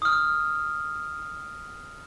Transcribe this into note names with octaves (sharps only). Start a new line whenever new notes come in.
D#6 F6